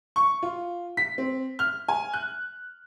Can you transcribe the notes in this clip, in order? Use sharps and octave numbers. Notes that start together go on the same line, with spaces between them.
C#6
F4
B6
C4
F6
G#5
F#6